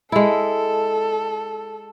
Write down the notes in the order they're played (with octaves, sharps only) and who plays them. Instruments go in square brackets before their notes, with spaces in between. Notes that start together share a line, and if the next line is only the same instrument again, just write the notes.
[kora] G#3 E4 [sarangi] A4